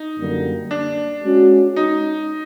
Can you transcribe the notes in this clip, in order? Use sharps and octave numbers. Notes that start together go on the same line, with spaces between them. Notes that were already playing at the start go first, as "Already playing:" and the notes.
Already playing: D#4
F#2 D3 G3 A#3
D4
G#3 C#4 F#4
D#4